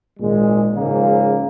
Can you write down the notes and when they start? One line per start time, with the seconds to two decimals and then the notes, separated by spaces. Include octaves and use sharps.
0.19 G#1 A#2 G#3
0.76 G#2 C#3 F3 A#3